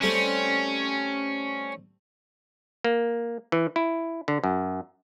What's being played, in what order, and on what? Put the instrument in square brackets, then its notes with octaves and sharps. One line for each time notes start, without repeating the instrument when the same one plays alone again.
[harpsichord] G3 A3 C4 [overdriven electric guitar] C#4
[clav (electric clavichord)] A#3
E3
E4
D3
F#2